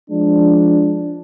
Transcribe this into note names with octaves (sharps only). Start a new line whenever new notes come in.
F3 G#3 D4